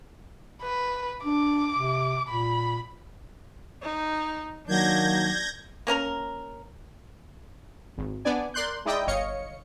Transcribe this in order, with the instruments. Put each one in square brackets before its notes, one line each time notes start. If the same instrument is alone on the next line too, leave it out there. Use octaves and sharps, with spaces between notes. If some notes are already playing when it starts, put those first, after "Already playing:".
[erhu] B4
[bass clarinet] D4 [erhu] D6
[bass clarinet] C3
[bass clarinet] A#2 [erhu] B5
[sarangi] D#4
[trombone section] D#3 A#3 [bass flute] F#3 [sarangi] D4 [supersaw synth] G6 G#6 A#6
[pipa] A#3 C#4 A#4 A#5
[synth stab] G#1
B3 D4 D5 G#5
A#4 D5 C6 F#6 G6
G#3 D#4 E4 D5 D#5 G5
G1 C#5 D#5 F5 C#7